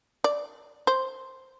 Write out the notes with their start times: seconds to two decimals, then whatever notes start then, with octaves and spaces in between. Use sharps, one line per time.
0.24 D5
0.87 C5